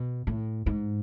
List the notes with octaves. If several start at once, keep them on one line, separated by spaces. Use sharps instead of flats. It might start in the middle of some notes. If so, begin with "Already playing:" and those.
Already playing: B2
A2
G#2